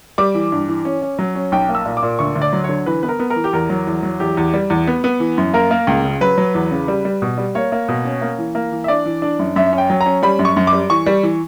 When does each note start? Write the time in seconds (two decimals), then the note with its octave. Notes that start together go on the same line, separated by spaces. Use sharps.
0.18 G3 D6
0.35 E3
0.52 G2
0.68 E3
0.85 C#4
1.02 C#4
1.19 F#3
1.35 C#4
1.52 B1 G5
1.69 A#3
1.75 E6
1.85 A#2
1.97 D6
2.03 A#2
2.19 D2 C#6
2.36 D2
2.42 D5
2.53 F#3
2.64 D3 C#5
2.86 E3 B4
3.03 B3 B4
3.09 A#4
3.20 B3
3.30 A#4
3.36 E3
3.44 G4
3.53 E2 A#4
3.70 F#3
3.87 E2
4.03 F#3
4.20 E2 G4
4.37 E2
4.54 G3
4.70 E2
4.87 B3
5.04 B3
5.20 E3
5.38 F#2
5.54 A#3 A#4
5.71 A#3
5.87 C#2
6.04 C#3
6.21 F#3 B4
6.38 F#3
6.54 E2
6.71 C#3
6.88 G3
7.05 G3
7.22 B2
7.38 G3
7.55 A#3 C#5
7.72 A#3
7.89 B2
8.05 C#4
8.21 A#3
8.38 E3
8.55 A#3
8.72 E3
8.84 E5
8.88 D4 D5
9.06 E3
9.22 D4
9.39 F#2
9.56 F#2 E5
9.73 C#4
9.78 G5
9.90 F#3
10.01 A#5
10.06 C#4
10.23 G3 B5
10.39 F#2
10.45 C#6
10.56 F#2
10.67 D6
10.73 G3
10.90 E3 C#6
11.06 G3
11.23 E3